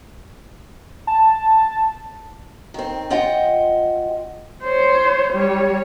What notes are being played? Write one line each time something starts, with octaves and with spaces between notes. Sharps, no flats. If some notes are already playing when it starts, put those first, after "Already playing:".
A5
D#3 C4
F2 F4 D#5 F#5 G5
C5 C#5
G3 C#5